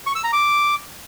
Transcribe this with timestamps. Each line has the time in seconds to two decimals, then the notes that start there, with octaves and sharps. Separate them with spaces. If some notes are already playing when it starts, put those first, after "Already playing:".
0.07 C#6
0.15 E6
0.24 A#5
0.33 D6